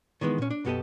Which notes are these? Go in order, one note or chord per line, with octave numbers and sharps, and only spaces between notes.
D#3 E3 G#3 B3
A#2 C#4
D4
B1 F#2 B3 G4 A4 D#5